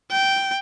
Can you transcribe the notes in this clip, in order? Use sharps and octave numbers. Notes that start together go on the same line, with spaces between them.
G5